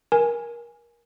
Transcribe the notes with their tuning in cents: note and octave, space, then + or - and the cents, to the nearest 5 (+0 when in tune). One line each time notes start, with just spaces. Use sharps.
A#4 +25 G#5 +0